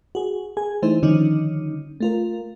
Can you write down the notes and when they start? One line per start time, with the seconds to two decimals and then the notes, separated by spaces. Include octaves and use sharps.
0.15 F#4 G#4
0.57 G#4 G#5
0.82 E3 A3 D#4 E4 C5
1.03 D3 D#3 F3 G3 C#4 D#4
2.01 A3 F4 A#4